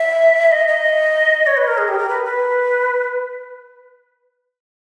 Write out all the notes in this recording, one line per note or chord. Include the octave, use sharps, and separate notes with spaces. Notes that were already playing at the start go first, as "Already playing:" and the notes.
Already playing: E5
D#5
D#5
C#5
B4
A#4
G#4
G4
A#4
B4
B4